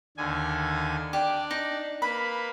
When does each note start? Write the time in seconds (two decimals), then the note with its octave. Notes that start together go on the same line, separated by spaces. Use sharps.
0.17 D#2 D3 G#5
1.13 D4 G4 D5
1.51 D#4
2.02 A#3 B4 B5